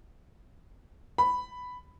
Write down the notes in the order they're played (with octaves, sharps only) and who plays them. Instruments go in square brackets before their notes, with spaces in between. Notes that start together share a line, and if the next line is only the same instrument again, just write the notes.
[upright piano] B5